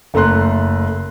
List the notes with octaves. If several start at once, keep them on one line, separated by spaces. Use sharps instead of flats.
F#1 A3 A4 A#5 C6 F#6